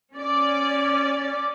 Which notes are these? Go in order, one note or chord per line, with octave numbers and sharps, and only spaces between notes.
C#4 D5